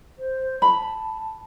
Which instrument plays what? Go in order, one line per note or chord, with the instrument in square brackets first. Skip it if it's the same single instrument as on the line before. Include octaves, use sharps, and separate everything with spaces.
[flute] C5
[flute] A5 [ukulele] B5